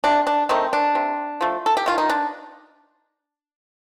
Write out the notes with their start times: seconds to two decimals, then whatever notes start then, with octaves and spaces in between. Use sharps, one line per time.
0.04 C3 D4
0.27 D4
0.49 D#3 A3 C4 D#4
0.73 D4
0.95 C3
1.41 F3 A3
1.66 A4
1.77 G4
1.86 D#3 F4
1.98 D#4
2.09 D4